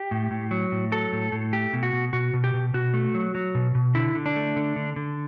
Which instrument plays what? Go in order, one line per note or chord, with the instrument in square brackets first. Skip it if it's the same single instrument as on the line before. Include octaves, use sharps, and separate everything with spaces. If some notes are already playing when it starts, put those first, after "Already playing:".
Already playing: [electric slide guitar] G4
A2
A2
F#3
A2
F#3 A4
A2
A2
A3 G4
B2
F#4
B2
B2 F#4
B2
G4
B2
B2 F#4
A3
F#3
F#3
B2
B2
D3 E4
D3
D4
A3
D3
D3
D3